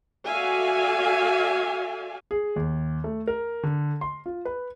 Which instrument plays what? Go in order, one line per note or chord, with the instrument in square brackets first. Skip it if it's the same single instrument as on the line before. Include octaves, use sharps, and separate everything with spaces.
[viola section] F#4 A4 D5 E5 F5 G#5
[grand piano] G#4
D#2
A3
A#4
D3
C6
F4
B4